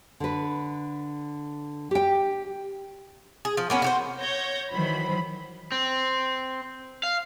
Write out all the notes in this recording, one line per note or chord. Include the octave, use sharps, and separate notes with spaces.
D3 B4
G4 G5
G#4
F3
A#3 B3 C#4
F#4 G4 C5
C#5 G6 A#6
D#3 E3 F#3 C5 B5
C4
F5